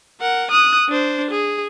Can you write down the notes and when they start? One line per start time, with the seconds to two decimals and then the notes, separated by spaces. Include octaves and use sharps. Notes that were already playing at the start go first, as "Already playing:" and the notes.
0.21 A#4 F#5
0.51 D#6 F#6
0.89 D4 C5
1.31 G#4